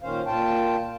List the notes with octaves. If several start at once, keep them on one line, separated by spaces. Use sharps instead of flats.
A#2 D#3 C#4 C5 F5
A#2 F4 G5 A5